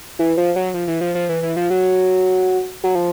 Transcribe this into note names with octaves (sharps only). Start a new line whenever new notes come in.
E3
F3
F#3
F3
E3
F3
F3
E3
E3
F3
F#3
F#3
F3